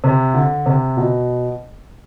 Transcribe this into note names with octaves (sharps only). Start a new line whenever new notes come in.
C3
D3
C3
B2